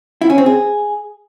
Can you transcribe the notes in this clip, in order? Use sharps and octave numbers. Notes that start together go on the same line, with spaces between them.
E4
C#4
C4
G#4